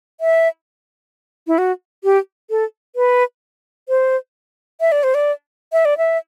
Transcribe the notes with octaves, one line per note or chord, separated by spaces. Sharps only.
E5
E4
F#4
G4
A4
B4
C5
E5
D5
C5
D5
E5
D5
E5